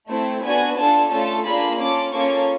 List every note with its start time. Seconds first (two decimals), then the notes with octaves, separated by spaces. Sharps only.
0.08 A3 C4 E4
0.43 B3 D4 F#4 G#5
0.77 D4 F4 A4 A5
1.10 A3 C#4 F4 A4 A5
1.44 A#3 D4 F4 G#4 B5
1.79 C#4 F4 A4 D6
2.12 A#3 C#4 F4 A4 C#6